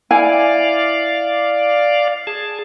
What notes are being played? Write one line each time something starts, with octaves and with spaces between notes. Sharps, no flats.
E4 D5 F5 G#5
G#4 A5